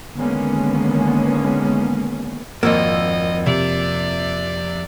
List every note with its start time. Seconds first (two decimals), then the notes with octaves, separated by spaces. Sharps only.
0.17 D3 D#3 G#3 A#3 B3 C#4
2.63 G#1 F2 F3 A#3 D#5 E6
3.46 C3 D5